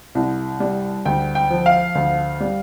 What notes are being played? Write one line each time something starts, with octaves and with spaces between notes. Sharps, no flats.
C2
G3
D2 G5
G5
F3
F5
D2
G3